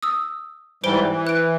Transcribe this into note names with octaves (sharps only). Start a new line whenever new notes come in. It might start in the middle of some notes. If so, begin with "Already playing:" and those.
D#6 E6
G#2 E3 G3 C5 D7 G7
E3
F#6 D7